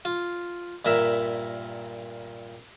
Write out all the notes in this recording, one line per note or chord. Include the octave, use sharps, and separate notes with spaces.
F4
G2 A#2 A#4 E5